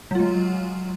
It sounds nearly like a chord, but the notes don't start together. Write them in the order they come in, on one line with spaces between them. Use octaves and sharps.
F#3 F4 G#3